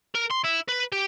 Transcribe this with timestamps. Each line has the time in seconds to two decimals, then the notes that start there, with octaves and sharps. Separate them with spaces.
0.15 A#4
0.30 C6
0.44 E4
0.68 B4
0.92 G4